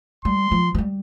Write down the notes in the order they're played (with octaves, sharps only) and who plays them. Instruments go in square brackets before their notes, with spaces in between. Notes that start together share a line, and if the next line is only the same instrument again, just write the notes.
[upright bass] G3 [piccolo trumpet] C6
[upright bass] F3
F3
G3